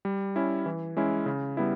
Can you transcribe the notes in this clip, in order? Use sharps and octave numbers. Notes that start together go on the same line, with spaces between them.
G3
C#4 E4
E3
G#3 C#4 E4
C#3
G3 B3 E4